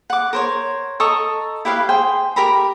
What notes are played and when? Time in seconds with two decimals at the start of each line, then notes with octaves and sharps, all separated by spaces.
0.10 F#5 D6
0.33 A#4 C5 C#5
1.00 A4 D#5 A#5 C#6
1.65 E4 G4 B4 F5
1.89 G#4 C5 G5
2.36 G4 A#4 A#5 B5